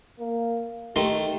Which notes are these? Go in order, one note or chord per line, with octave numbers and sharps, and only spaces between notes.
A#3
D#3 A3 G4 C6